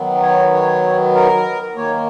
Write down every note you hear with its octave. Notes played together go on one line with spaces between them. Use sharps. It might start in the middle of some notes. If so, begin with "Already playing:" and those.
Already playing: D#3 F#3 B3
C#5
C#5
A#4
D#3 A#3 C#5